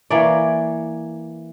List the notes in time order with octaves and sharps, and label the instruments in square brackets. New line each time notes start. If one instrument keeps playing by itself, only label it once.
[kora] E3 A#3 C#5 D5